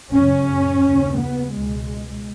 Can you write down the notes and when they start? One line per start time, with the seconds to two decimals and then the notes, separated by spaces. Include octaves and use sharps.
0.11 F#2 C#3 C#4
0.82 D#2 C#3
1.17 B3
1.53 C#2 B2 G#3